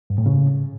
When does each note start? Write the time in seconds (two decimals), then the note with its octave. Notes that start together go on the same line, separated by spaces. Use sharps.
0.10 G2
0.18 A2
0.26 C#3